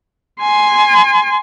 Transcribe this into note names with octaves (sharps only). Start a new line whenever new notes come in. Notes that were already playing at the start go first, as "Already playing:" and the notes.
G#5 C6